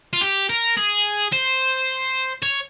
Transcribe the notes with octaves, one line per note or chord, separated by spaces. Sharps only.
F4
G4
A#4
G#4
C5
C#5